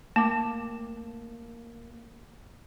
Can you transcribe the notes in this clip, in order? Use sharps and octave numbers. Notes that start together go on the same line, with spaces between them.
A3 A#3 A5 D6